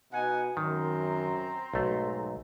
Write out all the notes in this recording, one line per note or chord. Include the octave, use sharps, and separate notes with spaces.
B2 D#4 F#5 G#5
F#2 D#3 C4 A#5 C6
B1 G#2 A3